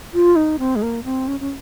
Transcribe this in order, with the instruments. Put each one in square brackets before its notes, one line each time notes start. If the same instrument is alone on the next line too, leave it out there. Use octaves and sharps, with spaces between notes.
[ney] F4
D#4
C4
G#3
A#3
C4
C#4
C#4